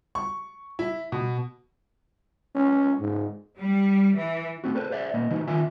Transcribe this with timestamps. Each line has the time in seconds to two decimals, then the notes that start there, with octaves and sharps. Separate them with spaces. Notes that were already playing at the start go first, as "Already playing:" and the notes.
0.15 C#6
0.79 E4
1.12 B2
2.55 C#4
3.00 G#2
3.58 G3
4.17 E3
4.64 A3 C4 F#4
4.75 A4 B4 C5
4.90 G#4 C5 D5 E5
5.14 A#2 A#3 D#5
5.30 E3 D#4 F#4
5.47 D#2 D#3 F4 E5 G#5